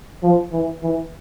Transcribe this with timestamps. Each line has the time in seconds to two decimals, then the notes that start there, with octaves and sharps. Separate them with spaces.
0.23 F3
0.52 E3
0.83 E3